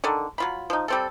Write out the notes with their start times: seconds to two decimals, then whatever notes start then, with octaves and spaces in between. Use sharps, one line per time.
0.04 D3 D#3 A4
0.38 F#3 F4 B5
0.70 F3 D#4
0.88 G3 C4 A4